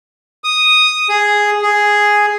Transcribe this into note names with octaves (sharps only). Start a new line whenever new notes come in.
D#6
G#4
G#4